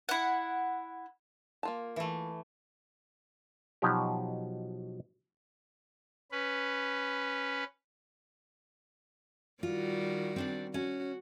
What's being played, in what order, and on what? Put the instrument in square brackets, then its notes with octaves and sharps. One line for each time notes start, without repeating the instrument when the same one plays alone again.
[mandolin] E4 F#5
[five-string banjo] A#3 F4 A5
[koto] E3 A3
[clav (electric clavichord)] B2 F3 F#3 D#4 G4
[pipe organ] C#4 B4
[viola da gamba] D#3 G3 F#4 [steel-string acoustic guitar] F4
[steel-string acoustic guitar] C4 D4 D5
[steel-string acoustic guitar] C#4 [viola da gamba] F#4